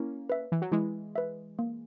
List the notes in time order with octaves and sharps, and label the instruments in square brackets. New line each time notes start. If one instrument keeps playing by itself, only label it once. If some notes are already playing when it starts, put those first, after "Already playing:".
Already playing: [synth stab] A#3 C#4 [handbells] E4
[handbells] B4 E5
[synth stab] E3
F#3
[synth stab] E3 G#3 [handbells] E4
[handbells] B4 E5
A#3